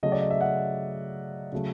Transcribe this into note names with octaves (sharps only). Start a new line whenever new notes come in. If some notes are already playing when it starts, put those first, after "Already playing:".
C#3 F#3 A3 D#5
D5
D#5
E5
F#5
C#3 F#3 A3